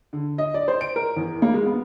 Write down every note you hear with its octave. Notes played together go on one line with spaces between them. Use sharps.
D3
D#5
D5
C5
D7
A#4
E2
A#3
G#3
B3